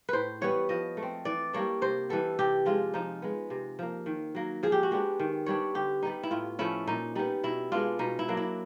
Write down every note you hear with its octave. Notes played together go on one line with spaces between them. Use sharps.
A2 B4 C5
E3 G3 B3 C#5
F3 D#5
A3
C4
E3 D5
G3 A#3 D4 C#5
C3 C5
E3 G3 B3 A4
C3 G4
F3 G#3 F4
F3 D#4
G#3 B3
C3
F3 A#3
D#3
F#3 A#3
F3 G#4
G4
F#4
G#3 B3 D4 G4
D#3
G3 B3 D4 C#5
D3 G4
G3 B3 D#4
E4
A2 F4
F3 A3 C#4 E4
A#2 D#4
G3 B3 D#4
B2 E4
G#3 B3 D4 F4
B2 D#4
E4
F#3 A#3 D4
E4